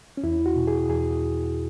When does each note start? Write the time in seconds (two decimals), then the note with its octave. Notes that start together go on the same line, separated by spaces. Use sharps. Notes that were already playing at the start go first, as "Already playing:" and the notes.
0.17 C#4
0.23 E2 E4
0.46 F#4
0.56 B2
0.67 G#4
0.89 E2 G#4